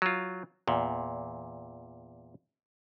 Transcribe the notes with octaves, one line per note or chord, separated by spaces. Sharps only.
F#3 F4
E2 A#2